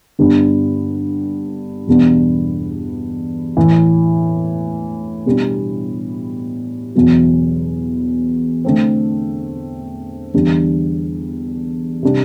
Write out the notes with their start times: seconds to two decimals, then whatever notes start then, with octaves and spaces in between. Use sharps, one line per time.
0.19 G2 D3 G3 B3 D4
1.87 E2 B2 G3 B3 D4
3.57 A2 E3 A3 E4
5.26 B2 G3 B3 D4
6.95 E2 B2 F#3
8.65 D3 A3 C4
10.34 E2 D3 G3 D4
12.03 C3 G3 D4